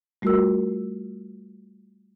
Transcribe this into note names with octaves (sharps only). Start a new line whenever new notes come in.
G3 A3 F4 F#4 A#4 E6